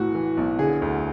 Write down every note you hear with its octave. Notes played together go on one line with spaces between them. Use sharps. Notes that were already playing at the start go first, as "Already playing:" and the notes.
Already playing: B1 A2 E3 F#4
E3
B1
D3 G#4
D2